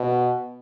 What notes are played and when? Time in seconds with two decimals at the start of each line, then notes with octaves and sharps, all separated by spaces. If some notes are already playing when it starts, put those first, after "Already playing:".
Already playing: B2